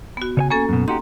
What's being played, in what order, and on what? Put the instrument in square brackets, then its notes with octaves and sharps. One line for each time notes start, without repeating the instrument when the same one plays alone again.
[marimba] B3 F#4
[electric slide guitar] C#3 C#5 G#5
[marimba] A#3 C#4 A4 [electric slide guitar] G#5
[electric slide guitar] F#2 B2
[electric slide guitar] D#4 F#4 G4 [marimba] A#5 C6